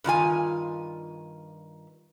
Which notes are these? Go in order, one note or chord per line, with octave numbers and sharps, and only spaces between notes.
G2 D#3 F4 G#5